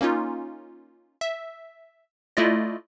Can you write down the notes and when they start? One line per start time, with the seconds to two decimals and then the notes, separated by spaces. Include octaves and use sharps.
0.01 A#3 C#4 D#4 F4
1.21 E5
2.37 A3 E4 F4 D5 D#5